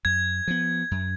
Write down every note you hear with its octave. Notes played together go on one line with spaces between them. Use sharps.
F#2 G#6
F3 B3
F#2